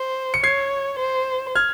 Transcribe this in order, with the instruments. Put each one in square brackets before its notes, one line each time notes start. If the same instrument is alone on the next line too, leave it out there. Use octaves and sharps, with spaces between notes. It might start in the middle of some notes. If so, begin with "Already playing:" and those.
Already playing: [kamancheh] C5
[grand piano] C#7
[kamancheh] C#5 [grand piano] G#6 C7
[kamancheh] C5
[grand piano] F6 G#6